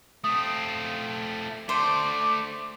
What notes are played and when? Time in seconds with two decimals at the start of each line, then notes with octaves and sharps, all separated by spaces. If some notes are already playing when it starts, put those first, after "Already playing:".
0.24 A3 C4 D#6
1.69 A3 D4 C5 D6